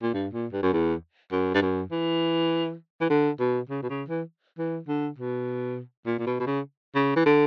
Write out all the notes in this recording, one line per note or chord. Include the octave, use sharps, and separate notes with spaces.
A#2
G2
A#2
G2
F#2
E2
F#2
G2
F#2
E3
E3
D3
B2
C#3
B2
C#3
E3
E3
D3
B2
A#2
A#2
B2
B2
C#3
C#3
E3
D3